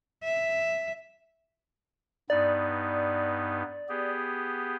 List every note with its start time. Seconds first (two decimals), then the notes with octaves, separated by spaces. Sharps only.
0.24 E5
2.30 G2 B3 D#4 D5
3.89 B3 G4 G#4